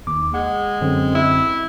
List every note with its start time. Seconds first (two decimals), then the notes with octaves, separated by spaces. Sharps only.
0.07 D#2 D6
0.34 G#3 F#5
0.81 F#2 D3 C4
1.15 E4